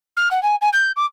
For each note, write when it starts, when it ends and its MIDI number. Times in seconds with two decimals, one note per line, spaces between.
0.17 0.29 89
0.31 0.42 78
0.43 0.55 80
0.61 0.69 80
0.73 0.92 91
0.96 1.06 86